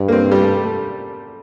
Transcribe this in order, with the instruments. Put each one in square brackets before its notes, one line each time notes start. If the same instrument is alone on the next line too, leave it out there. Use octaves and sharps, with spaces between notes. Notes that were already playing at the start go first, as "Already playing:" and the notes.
Already playing: [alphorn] G2
[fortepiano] A#3
C4
G3
A3
A3